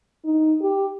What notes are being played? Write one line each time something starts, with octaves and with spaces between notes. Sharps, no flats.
D#4
G4